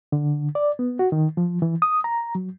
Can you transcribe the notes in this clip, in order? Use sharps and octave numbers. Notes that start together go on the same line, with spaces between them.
D3
D5
B3
F#4
D#3
F3
E3
D#6
A#5
F#3